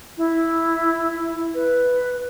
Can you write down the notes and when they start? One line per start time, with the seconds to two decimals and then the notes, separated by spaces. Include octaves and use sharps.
0.18 E4
1.54 B4